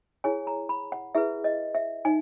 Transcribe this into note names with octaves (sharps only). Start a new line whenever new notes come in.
E4 G#4 C#5 G#5
A#5
B5
F#5
E4 G#4 B4 E5
D#5
E5
D#4 G#5